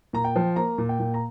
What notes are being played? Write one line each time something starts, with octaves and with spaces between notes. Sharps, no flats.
A#2 A#5
G5
F3
A#3 A#5
A#2
G5
A#2
A#5